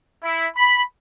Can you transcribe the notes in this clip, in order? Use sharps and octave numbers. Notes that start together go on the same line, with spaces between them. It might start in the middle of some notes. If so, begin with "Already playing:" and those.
E4
B5